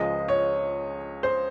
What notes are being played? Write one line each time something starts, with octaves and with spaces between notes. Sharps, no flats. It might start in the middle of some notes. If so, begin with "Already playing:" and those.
Already playing: C#2 C#3 F3 G#3 D#5
C#5
C5